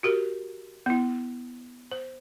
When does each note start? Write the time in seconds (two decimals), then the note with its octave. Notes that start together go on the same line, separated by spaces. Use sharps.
0.03 F#4 G4 A#4
0.86 B3 E4
1.91 C5